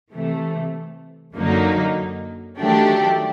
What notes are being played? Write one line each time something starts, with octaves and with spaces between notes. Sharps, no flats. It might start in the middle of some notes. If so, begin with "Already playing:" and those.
C3 E3 A3
F#2 D3 F#3 A#3 D#4
D#3 F#3 A3 D4 G4